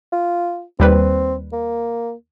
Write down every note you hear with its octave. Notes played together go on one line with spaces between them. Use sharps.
F4
D#2 G3 C4 B4
A#3